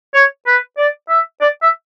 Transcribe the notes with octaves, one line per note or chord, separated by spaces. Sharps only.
C#5
B4
D5
E5
D5
E5